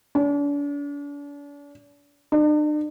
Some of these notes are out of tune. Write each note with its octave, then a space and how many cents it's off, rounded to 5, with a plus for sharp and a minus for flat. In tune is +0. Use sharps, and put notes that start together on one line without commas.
D4 -40
D4 +45